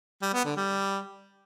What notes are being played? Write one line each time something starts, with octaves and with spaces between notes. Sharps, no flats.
G3
B3
D3
G3